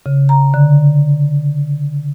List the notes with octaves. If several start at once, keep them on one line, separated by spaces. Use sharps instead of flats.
C#3
A#5
D3